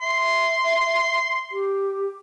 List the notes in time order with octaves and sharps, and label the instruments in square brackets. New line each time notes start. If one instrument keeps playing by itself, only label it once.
[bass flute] E5 [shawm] C6
[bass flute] G4